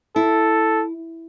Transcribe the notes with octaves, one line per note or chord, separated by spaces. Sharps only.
E4 A4